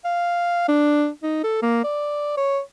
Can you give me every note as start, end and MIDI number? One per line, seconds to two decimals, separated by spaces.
0.05 0.68 77
0.68 1.08 62
1.23 1.39 63
1.43 1.59 69
1.62 1.81 58
1.84 2.33 74
2.37 2.60 73